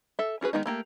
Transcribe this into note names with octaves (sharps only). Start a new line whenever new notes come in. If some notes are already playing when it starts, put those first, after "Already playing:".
A4 E5
C#4 F#4 G#4 B4
D#3 G#3 B3 D#4
A3 A#3 G4